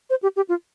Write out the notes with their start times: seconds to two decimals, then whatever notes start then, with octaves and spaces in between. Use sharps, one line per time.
0.10 C5
0.23 G4
0.36 G4
0.49 F4